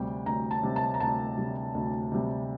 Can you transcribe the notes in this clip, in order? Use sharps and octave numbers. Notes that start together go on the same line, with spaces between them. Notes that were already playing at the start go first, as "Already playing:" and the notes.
Already playing: D2 C3 G3 G5
D2 A#5
A5
C3 G3
A5
A#5
D2 A5
C3 G3
D2
C3 G3